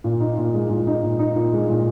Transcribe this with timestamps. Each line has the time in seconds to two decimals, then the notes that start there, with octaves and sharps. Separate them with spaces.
0.04 A#2
0.20 D#4
0.38 A#2
0.54 G#3
0.70 A#2
0.87 D#4
1.03 A#2
1.19 D#4
1.36 A#2
1.53 G#3
1.70 A#2